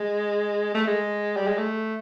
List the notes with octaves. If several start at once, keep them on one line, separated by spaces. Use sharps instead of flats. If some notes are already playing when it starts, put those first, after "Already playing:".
Already playing: G#3
A3
G#3
G3
G#3
A3